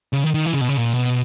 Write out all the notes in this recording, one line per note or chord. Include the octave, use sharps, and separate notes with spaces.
C#3
D#3
D#3
E3
C#3
B2
C#3
A#2
B2